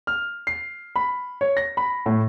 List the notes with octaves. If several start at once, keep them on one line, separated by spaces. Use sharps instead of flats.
F6
C7
B5
C#5
A#6
B5
A2